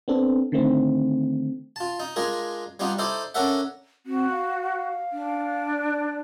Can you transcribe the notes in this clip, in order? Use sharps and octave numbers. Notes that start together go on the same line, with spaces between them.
B3 C4 D4 A4
D3 D#3 A3 C4
F4 A5
D#4
G#3 D4 F4 G#4 A#4
G3 B3 D4 D#4 F4
D#4 E4 A4 C5 D5
C#4 D4 A4 A#4 E5 F#5
C4 F#4
F5
D4
D5